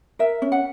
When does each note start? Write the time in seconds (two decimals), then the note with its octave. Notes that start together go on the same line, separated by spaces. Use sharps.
0.19 A#4 E5
0.42 C#4
0.52 F#5